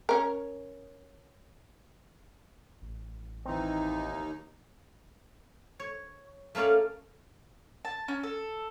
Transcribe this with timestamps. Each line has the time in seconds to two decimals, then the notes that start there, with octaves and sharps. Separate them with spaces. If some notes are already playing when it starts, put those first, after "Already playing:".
0.09 C#4 A#4
2.82 A1
3.46 D#2 E3 C4 D#4
5.80 C#5
6.55 A3 A#3 C#4 D5 F5
7.85 A5
8.08 C#4
8.23 A4